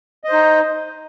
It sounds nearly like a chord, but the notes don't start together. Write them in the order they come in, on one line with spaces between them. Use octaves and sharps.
D#5 C5 D#4